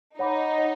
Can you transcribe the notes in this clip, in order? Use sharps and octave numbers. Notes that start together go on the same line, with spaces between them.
D#4 C#5 F#5 B5 D6
C#5 F#5